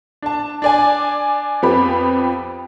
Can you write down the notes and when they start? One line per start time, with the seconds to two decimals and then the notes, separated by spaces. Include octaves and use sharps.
0.22 D4 A5
0.62 D4 D5 G#5
1.62 F2 F3 B3 G4 B5